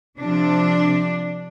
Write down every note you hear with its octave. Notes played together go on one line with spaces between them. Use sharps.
C3 F3 D4